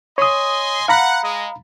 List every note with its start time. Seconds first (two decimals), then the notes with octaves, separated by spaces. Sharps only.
0.18 C#5 D#5 G#5 C6 D#6
0.88 F5 F#5 A#5 B5
1.24 G#3 D#5